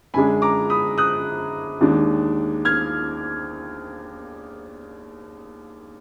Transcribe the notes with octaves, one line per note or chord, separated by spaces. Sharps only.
F#2 D3 G#3 D4 G#5 B5
A#5 D6
B5 D#6
D#6 F#6
D#2 D#3 G#3 D4
F6 G#6